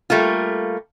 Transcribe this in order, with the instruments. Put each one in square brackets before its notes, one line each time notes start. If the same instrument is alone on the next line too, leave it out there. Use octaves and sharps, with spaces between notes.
[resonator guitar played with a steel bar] G3 A3 A#3 F4